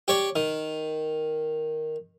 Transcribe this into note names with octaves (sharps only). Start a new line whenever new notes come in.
G4 C#5 D5
D#3